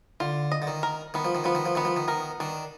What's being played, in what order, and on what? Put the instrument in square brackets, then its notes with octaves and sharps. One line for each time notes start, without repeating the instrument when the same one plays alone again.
[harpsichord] D3 [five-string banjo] F4
[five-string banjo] D#5
[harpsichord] D3
D#3
[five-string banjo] A#4
[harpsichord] D#3 [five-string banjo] B3
[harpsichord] F3
D#3
[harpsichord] F3 [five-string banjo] B3
[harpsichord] D#3
F3
[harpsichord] D#3 [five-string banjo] B3
[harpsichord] F3
D#3
[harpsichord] D#3 [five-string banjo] A#4
[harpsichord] D#3 [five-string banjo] D4